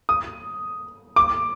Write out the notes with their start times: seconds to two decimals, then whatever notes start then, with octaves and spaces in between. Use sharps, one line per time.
0.09 D#6
1.16 D6